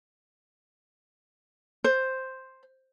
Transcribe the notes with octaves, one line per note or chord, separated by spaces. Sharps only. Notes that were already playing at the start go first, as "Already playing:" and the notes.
C5